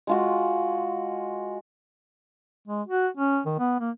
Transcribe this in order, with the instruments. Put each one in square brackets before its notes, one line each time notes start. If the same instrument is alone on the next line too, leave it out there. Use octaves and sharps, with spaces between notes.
[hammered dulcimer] G#3 F4 F#4
[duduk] G#3
F#4
C#4
D#3
B3
A#3